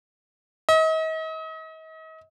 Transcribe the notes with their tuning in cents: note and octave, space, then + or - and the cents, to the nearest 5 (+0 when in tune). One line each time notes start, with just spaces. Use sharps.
D#5 +40